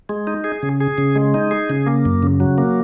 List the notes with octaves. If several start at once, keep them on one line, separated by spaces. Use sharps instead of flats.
G#3
D#4
G#4
C#3
G#4
C#3
G#3
D#4
G#4
C#3
A#3
F#2
C#3
F#3
A#3